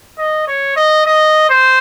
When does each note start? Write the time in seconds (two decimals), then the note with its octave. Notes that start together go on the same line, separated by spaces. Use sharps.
0.18 D#5
0.48 C#5
0.76 D#5
1.06 D#5
1.49 C5